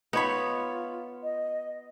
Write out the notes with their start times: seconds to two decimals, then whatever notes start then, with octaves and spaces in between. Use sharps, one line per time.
0.13 B3 D#4 F4 C#5 B5
1.23 D#5